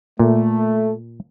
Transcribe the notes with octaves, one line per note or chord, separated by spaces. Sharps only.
A#2 A3